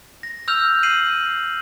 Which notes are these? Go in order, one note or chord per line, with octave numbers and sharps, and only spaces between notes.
A#6
E6 F6 G6 F7
C7 D#7 F#7